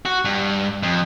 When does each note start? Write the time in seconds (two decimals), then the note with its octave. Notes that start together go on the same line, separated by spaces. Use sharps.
0.05 F#4
0.25 G2
0.83 F2